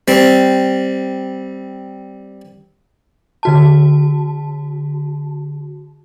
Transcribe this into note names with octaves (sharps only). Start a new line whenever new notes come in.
G3 C4
D3 F#4 A5